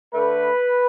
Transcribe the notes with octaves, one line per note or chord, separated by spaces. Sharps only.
D3 A3 B4